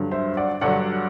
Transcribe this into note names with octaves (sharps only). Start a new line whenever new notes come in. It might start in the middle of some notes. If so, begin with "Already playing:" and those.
Already playing: G2 D3 F#3
C5 E5
D5 F#5
G2 D3 F#3 D5 F#5